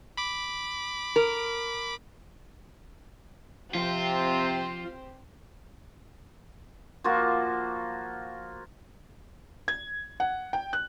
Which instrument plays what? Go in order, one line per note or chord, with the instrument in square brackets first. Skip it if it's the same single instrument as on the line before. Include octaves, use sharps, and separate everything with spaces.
[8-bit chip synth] B5 D6
[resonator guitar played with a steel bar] A#4
[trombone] C3 [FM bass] F3 [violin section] C4 G4 C5 [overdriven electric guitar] F4
[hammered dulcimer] F3 A#3 F4 F#4
[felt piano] G#6
F#5
G5
F#6